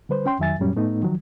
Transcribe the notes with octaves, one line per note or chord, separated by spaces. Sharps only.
D3 G3 B4 C5
C#4 G5 C6
F2 D#3 F#3 E5 G#5 A6
F#2 A#2 F#3 G3 C#4
A2 A3 B3 D#4
D#3 F3 F#3